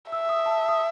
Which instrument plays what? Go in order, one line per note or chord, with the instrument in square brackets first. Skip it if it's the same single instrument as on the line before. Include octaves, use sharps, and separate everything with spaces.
[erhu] E5 [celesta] E6
[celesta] D#6
A5
D#6